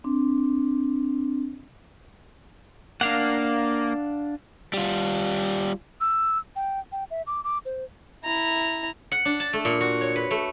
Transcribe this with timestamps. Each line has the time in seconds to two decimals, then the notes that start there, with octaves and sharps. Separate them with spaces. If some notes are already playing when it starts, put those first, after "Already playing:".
0.04 C4 D4
3.01 A#3 D4 F5 F#5
4.74 G3 F4
6.01 E6
6.56 G5
6.92 G5
7.11 E5
7.27 D6
7.44 D6
7.65 C5
8.25 E4 A#5
9.12 F#5
9.25 D4
9.40 A5
9.53 A3
9.65 A#2
9.81 F#4
10.01 C#5
10.16 B4
10.31 A3